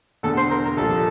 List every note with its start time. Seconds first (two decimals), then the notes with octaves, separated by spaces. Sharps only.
0.23 E1 E2 D3 A4
0.37 C5
0.51 A#4
0.64 A#4
0.77 C2 A#2 F3 A4